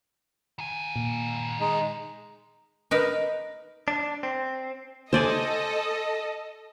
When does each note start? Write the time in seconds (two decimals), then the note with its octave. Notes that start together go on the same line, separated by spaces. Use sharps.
0.58 D#3 G#5
0.96 A#2
1.60 G#3 D#4
2.91 D#4 A#4 B4
3.88 D4
4.23 C4
5.13 A4 C5 D5 D#5 G#5